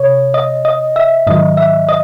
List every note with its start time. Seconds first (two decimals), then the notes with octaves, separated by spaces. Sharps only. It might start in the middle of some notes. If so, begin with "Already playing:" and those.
Already playing: C3 C#5
0.34 D#5
0.65 D#5
0.96 E5
1.27 G#2 D#3 F#3 D#5
1.57 E5
1.89 D#5